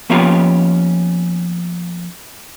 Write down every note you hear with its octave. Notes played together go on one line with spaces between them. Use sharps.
F3 A#3 B3 C#4 F4 G4